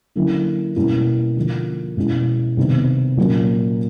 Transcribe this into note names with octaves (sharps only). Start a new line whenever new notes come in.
D3 F#3 A#3 C#4 E4
B2 G3 A#3 C#4 E4
D3 F3 A#3
B2 G#3 C#4 E4
C3 D#3 G3 B3
A#2 F#3 A#3 C#4